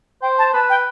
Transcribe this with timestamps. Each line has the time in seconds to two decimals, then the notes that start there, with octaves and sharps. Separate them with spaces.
0.22 C5 G5
0.38 A5
0.53 B4 A5
0.70 G5